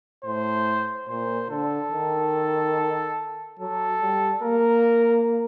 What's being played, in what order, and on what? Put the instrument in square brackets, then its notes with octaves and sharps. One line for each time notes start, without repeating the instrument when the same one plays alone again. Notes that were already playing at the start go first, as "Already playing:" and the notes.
[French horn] A2 [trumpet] C5
[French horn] A#2 [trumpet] C5
[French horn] D3 [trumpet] A4
[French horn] D#3
[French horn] F#3 [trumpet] A4
[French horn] G3
[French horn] A#3 [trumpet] A#4